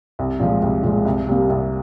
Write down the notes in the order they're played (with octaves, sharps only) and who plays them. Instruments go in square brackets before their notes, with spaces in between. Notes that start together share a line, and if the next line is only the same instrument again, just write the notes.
[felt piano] C2
A#2 F3 G#3
C2
A#2 F3 G#3
C2
C3 G3 A#3
C2